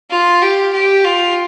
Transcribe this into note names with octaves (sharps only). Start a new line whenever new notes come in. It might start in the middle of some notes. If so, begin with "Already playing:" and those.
F4
G4
G4
F4